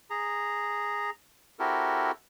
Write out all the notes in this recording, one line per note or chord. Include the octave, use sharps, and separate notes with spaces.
G#4 A#5
C4 E4 F#4 G4 A4 A#4